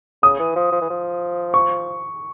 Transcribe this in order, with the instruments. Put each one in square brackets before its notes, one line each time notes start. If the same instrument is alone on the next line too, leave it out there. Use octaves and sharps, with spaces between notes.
[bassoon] C#3 [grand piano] D#6
[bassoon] E3
F3
F3
E3
F3
[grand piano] C#6